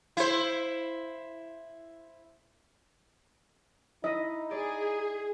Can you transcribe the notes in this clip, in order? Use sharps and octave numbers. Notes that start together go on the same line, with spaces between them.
E4 C5
D#4 E4 D#5
G#4 D5